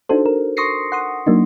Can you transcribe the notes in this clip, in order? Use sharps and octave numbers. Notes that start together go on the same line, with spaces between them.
D4 D#4 F#4 A4 C5
A#4
C6 C#6 D#6 A#6 C7 C#7
F#5 C6 D#6
F#3 A#3 D4 D#4